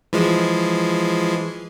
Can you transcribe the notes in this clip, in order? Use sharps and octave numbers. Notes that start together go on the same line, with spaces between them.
E3 F3 G#3